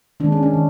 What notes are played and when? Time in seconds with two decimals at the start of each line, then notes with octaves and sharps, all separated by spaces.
0.20 D#3 G#3 D4
0.32 C#4
0.43 D4
0.54 D#3